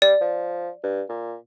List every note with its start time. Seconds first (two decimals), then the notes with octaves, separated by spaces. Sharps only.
0.02 G3 D5
0.21 F3
0.84 G2
1.09 A#2